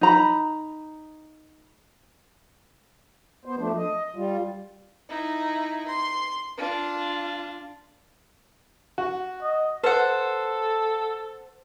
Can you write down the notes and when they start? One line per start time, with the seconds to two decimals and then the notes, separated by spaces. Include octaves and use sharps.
0.01 D#4 A#5 B5
3.46 B3 C5
3.59 F3 A3 D4
3.77 D#5
4.16 G3 F4
5.09 D#4 E4
5.88 C6
6.57 D4 F4
8.98 F#4
9.42 D#5
9.84 A4 B4 C5 F#5